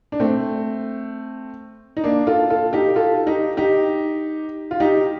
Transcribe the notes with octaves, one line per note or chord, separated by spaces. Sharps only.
D4
A3 C4
D#4
A#3 D4
F4 A4
F4 A4
D#4 G4
F4 A4
D#4 G4
D#4 G4
F4
D#4 G4